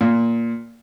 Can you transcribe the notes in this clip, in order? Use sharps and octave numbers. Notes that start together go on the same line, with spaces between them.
A#2